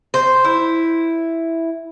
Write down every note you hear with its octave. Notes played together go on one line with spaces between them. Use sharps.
C5
E4